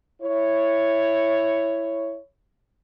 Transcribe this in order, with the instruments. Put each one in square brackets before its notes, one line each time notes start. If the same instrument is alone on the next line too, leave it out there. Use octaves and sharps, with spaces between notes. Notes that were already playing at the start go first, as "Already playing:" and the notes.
[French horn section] E4 C#5